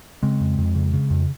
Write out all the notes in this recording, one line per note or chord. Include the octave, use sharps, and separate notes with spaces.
C#3 G#3 C4
F2
F2
C#3
C#3
F2